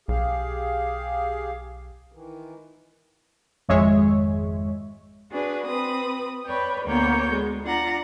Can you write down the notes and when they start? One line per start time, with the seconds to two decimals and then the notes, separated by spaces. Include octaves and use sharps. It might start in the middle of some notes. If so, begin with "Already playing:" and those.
0.08 B1 G4 G#4 F5
2.12 D#3 E3
3.68 G#1 F2 G#3 C#5 E5
5.31 D4 F#4 G#4 B4
5.66 C4 B4 D#6
6.45 B4 C#5 D5 G5
6.85 D2 A#3 B3 C#5 G5 G6
7.32 G#3
7.64 D4 F4 D5 F#5 A#5